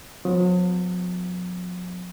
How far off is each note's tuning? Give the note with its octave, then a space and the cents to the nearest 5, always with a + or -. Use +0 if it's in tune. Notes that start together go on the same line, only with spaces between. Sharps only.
F#3 -45 B3 +45